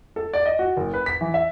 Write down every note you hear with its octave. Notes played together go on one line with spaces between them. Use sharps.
A4
D5
D#5
F#4
F#1
B4
B6
E3
E5